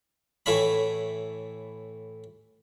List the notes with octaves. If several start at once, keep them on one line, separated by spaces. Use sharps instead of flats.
A2 E3 A3 C#5 B5